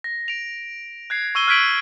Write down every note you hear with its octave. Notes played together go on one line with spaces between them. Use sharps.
A#6
D7 F7
F#6 G#6 C7
C#6 E6 D#7 G7
F6 F#6 G#6 B6 D7 F#7